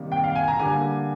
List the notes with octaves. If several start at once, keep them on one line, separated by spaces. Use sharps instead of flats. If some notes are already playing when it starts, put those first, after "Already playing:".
Already playing: C3 D#3 G3 A#3
G5
F5
G#5
A#5
D3 G3 A#3 G#5